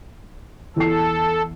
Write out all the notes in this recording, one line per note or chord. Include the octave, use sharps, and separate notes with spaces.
E2 A4 C7